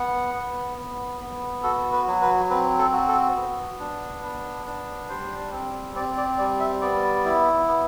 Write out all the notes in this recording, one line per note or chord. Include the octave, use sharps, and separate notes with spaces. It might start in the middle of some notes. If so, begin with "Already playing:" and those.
Already playing: B3 F#5
B3
B3
B3
F#4 A4
B4
F#3
B4
C4 B4
A4
F#4
A4
B3
D4
B3
D4
G3 C5
C4
C4 D5
D5
G3 D5
E5
B3 D5
E4
B3